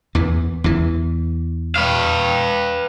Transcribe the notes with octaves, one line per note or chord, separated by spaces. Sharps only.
E2 E3
E2 E3
B4 F5